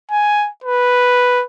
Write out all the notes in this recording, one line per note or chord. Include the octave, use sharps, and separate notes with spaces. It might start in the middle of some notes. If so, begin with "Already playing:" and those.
G#5
B4